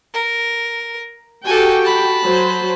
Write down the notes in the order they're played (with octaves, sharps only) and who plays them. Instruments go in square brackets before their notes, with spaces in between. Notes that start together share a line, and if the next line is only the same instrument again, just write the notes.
[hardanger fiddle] A#4
[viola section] F#4 G4 G5 [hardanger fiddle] A4 G#5
[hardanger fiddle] A5 B5
[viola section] F#3 C5